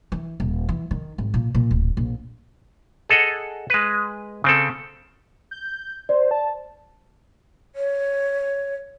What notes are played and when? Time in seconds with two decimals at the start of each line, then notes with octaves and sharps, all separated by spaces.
0.12 E3
0.40 D#1
0.69 E3
0.91 D#3
1.18 G#1
1.34 A#2
1.55 A#2
1.71 D1
1.97 A#1
3.09 G#4 A4 D#5 F#5
3.70 G#3 B4
4.44 C#3 C4 A4
5.51 G6
6.09 C5 D5
6.31 A5
7.74 C#5